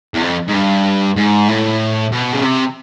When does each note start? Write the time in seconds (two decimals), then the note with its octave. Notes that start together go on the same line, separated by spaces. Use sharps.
0.14 E2
0.21 F2
0.48 G#2
0.53 G2
1.16 G#2
1.48 A2
2.12 B2
2.33 C#3
2.44 C3